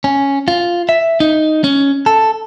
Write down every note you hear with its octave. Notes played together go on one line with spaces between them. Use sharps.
C#4
F4
E5
D#4
C#4
A4